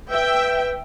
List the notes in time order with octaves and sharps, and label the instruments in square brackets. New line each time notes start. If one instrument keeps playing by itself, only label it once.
[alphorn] B4 [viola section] E5 G5